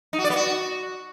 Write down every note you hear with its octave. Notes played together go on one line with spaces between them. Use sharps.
D#4
F#4
D5
B3
F#4